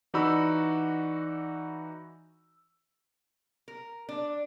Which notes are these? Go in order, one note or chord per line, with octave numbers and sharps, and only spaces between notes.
E3 D#4 F#4 D5 B5 E6
A#4
D4